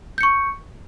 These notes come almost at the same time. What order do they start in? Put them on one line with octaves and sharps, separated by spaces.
G6 C#7 C#6